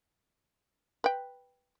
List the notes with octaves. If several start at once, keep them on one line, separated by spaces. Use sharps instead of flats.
B4 G5